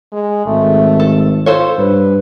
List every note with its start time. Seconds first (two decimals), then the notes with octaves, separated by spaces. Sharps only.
0.12 G#3
0.47 G#1 A3
1.00 A4
1.46 F4 A4 C5 C#5
1.78 G2 B4